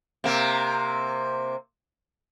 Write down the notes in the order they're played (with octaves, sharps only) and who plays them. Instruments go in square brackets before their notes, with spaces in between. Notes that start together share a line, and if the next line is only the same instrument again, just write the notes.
[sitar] C3 A#3